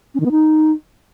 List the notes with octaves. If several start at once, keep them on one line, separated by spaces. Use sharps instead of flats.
C#4
D#3
B3
D#4